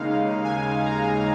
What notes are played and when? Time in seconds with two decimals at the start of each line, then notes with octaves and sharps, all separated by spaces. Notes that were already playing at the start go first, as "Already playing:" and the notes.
Already playing: D#2 C#3 G#3 D#4 F5
0.44 G#5
0.86 A#5